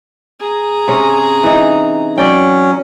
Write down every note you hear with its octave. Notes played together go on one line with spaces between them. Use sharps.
G#4 A#5
C3 C#4
E3 D#4
F#3 C#4 D5 G5